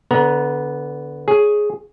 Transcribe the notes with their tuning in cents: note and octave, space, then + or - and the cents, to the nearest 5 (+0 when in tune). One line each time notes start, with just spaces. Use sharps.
D3 -20 B3 +0 A#5 +30
G#4 +5 C#5 +0